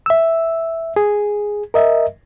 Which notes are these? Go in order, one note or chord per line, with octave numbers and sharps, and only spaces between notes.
E5 E6
G#4
A#4 D#5 E5